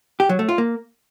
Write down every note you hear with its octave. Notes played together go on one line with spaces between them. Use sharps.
G4
F#3
A3
F4
A#3